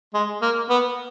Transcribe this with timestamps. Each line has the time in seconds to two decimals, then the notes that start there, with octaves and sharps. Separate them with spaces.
0.14 G#3
0.42 A#3
0.70 B3